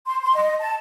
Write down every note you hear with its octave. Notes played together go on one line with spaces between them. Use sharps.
C6
C6
D#5
A5